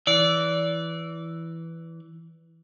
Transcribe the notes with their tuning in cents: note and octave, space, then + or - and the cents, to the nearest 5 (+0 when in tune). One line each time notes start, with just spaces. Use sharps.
E3 +0 D5 -25